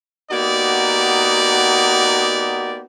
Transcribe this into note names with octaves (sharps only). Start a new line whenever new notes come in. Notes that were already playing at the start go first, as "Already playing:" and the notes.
A#3 B3 D#4 F#4 G4 D5